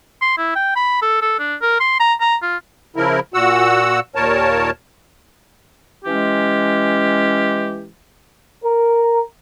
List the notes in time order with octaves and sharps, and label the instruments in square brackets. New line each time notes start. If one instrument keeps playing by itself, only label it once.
[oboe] C6
E4
G5
B5
A4
A4
D4
A#4
C6
A#5
A#5
F4
[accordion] C#3 F3 E4 A#4
A#2 F#4 F#5 E6
D#2 A#2 A#4 C#5 A5
[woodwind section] E3 G#3 C#4 G4
[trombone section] A#4